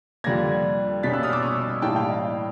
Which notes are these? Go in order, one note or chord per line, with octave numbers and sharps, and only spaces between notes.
F2 D3 G3 A#3 G#6 A#6
B2 G3 A#3 C#4 A6 B6
E6 F#6
D#6 F6
D6 E6
C#6 D#6
A2 E3 G3 A#3 G5 A5
F5 G5
D#5 F5